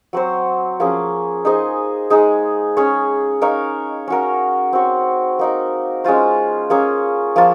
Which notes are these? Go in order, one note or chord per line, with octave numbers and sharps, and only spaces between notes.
F#3 C4 F#4 C5
F3 A#3 C#4 G#4
D#4 G#4 C5 D#5
G#3 D#4 G#4
C#4 G#4 C#5
D#4 A#4 C#5 F5
C#4 F#4 A#4
C4 F#4 C#5
A#3 D#4 A#4
G#3 C#4 F4 C5
A#3 C#4 G#4 C#5
F3 A#3 F4